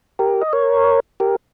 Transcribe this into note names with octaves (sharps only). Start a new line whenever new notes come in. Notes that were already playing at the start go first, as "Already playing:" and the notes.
G4 A#4
D#5
A#4 C#5
G4 A#4